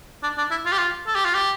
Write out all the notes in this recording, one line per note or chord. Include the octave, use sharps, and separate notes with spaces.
D4
D4
E4
F4
G4
F4
A4
G4
F4
G4